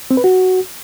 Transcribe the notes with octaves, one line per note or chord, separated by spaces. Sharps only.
C4
B4
F#4